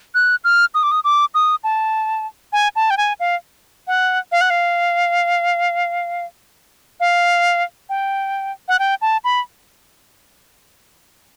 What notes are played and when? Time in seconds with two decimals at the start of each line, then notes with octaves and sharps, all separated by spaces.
0.15 F#6
0.44 F6
0.75 D#6
0.83 D6
0.91 D#6
1.04 D6
1.35 D#6
1.64 A5
2.53 G#5
2.76 A5
2.90 G5
2.97 G#5
3.20 F5
3.87 F#5
4.32 F5
4.41 F#5
4.50 F5
7.00 F5
7.89 G5
8.68 F#5
8.79 G5
9.02 A5
9.24 B5